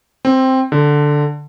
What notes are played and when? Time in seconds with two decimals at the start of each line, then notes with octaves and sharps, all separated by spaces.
0.25 C4
0.72 D3